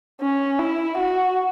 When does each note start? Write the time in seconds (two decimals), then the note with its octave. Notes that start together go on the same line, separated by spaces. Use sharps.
0.21 C#4
0.59 E4
0.98 F#4